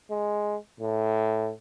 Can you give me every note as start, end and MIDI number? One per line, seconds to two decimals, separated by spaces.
0.11 0.56 56
0.80 1.51 45